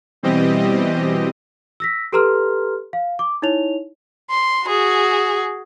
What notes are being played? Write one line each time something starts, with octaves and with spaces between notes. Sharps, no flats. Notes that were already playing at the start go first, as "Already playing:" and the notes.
B2 E3 G3 C4 G4 D#5
E6 A#6 B6
G4 A4 B4 A#5 C6 F6
F5
D6
D#4 E4 C#5 F7
C6
F#4 G#4